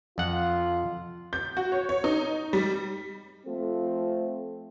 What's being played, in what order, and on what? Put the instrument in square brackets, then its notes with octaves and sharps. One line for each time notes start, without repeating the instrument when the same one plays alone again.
[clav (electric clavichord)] F2 F#5 [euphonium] F4
[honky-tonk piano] G6
F#4
C#5
C#5
D#4
G3
[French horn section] F3 A3 C4 F4 A4